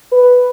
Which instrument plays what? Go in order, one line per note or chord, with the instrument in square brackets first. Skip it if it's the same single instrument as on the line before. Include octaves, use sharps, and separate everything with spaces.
[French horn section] B4